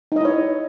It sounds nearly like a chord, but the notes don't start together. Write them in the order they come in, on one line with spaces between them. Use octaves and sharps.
D#4 D#5 E4 C#5